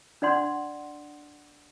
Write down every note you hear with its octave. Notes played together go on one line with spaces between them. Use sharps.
D4 D5 F#5 C6